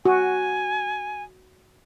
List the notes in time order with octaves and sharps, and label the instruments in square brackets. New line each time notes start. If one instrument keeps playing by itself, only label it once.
[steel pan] F#4 [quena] G#5